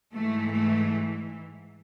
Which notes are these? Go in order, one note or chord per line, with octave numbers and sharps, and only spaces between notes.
G#2 E3 A3
A3